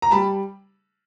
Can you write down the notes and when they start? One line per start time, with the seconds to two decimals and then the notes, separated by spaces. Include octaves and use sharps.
0.02 A#5
0.11 G3 A5 B5